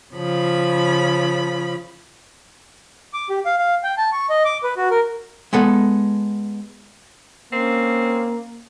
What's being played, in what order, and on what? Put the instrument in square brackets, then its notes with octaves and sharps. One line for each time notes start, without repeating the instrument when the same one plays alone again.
[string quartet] C#3 F3 B5
[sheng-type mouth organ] D6
G4
F5
F5
G5
A5
C#6
D#5
D6
B4
F#4
A#4
[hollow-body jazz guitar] G#3 B3 A4 F#5
[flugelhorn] A#3 [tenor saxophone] C4 [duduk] C#4